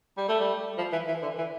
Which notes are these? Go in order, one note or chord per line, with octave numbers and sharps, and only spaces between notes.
G3
A3
G3
F3
E3
E3
D3
E3